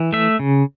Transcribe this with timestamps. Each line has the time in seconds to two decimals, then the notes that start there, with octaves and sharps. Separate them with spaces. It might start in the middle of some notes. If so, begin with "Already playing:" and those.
Already playing: E3
0.13 A3 E5
0.39 C#3